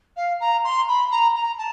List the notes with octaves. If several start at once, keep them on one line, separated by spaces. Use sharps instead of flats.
F5
A#5
C6
B5
A#5
A#5
A5